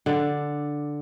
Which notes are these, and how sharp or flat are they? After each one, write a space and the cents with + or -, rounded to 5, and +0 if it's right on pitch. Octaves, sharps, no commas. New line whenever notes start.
D3 +0 D5 +0